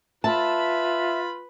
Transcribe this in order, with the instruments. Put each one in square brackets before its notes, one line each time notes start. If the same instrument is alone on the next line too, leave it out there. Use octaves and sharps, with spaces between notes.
[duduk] F4 [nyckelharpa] B4 B5 [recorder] E5 [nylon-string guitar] A5